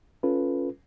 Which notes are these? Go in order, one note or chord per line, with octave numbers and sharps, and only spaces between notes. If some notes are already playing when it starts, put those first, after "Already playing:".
C#4 F4 A4 B4